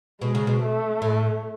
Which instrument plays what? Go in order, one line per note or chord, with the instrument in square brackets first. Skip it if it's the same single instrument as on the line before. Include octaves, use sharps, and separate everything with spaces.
[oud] B2 [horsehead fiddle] G#3
[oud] C#3
B2
[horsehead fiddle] A3
[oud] A2